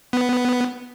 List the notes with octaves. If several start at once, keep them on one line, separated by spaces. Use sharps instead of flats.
B3